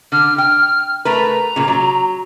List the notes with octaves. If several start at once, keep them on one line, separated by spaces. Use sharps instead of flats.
D3 F6
G5 F6
A3 A#4 B4 A#5
A#2 C#3
F#3